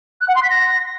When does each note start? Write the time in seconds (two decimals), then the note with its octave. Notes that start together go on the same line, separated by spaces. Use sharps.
0.21 F#6
0.28 F#5
0.36 C6
0.43 B6
0.50 A#6